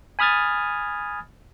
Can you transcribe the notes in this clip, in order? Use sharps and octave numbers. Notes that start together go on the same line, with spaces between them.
G#5 B5 D#6 F6 G#6 A6